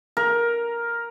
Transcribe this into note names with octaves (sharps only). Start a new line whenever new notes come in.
A#4